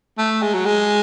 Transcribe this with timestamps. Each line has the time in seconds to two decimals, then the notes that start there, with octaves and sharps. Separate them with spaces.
0.18 A3
0.42 G#3
0.54 F#3
0.66 G#3